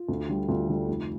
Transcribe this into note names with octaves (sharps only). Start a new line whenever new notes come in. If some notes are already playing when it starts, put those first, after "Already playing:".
Already playing: F4
D2
D3 G3
D2 F4
D3 G3
F1